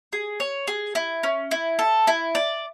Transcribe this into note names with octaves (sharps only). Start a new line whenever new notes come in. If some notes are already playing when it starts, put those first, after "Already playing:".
G#4
C#5
G#4
E4
C#4
E4
A4
E4
D5